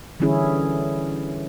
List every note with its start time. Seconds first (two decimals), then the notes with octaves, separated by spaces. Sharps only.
0.20 D3 E3 G3 C#4 E4 G#4